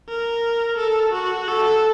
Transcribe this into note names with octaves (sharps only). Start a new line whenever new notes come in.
A#4
A4
F#4
A4